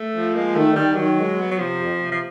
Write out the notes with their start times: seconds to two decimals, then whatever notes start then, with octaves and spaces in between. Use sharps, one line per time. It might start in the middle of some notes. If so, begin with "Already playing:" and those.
Already playing: A3
0.14 F3
0.34 G#3 A#3
0.55 D#3 A3
0.75 D#3 G3
0.96 D#3 F#3
1.18 G#3
1.38 B3
1.51 F#3
1.58 C3 F3
1.78 F2
1.99 C3
2.12 F3